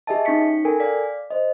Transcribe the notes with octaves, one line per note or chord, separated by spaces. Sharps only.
G4 G#4 D#5 E5 G#5 A5
C#4 D#4 C#6 B6 C#7
A4 A#4 G5 G#5
D5 F5 B6
C5 D#5